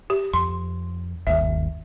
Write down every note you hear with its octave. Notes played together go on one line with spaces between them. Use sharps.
G4
F2 C6
G1 D#2 D#3 E5